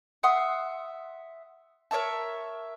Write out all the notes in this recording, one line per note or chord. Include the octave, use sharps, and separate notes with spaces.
E5 F#5 C6 D#6
A#4 C#5 E5 A5